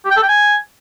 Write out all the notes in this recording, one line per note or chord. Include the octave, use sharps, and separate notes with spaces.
G4
G5
A4
G5
G#5